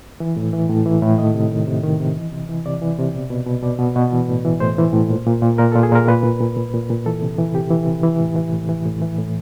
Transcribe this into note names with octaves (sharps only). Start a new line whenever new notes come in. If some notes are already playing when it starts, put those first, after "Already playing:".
E3
A2
E3
A2
E3
A2
D#3 D#5
C3
D#3
C3
D#3
C3
E3
C3
E3
C3 D5
E3
C3
B2
B2
B2
B2 D5
B2
B2
E3
A2
E3
A2 C5
E3
A2
A#2
A#2
A#2
A#2 A#4
A#2 A4
G#4
A#2 A#4
A#2 B4
A#2
A#2
A#2
A#2
A#2
E3 A4
C3
E3
C3 G4
E3
C3
E3
A2
E3
A2
E3
A2
E3
A2